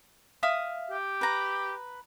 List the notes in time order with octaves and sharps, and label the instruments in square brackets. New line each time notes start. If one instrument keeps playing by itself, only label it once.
[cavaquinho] E5 F5 D#6
[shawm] G4
[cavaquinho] B4 A#5